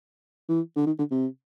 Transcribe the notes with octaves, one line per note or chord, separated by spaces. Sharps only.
E3
D3
D#3
D3
C3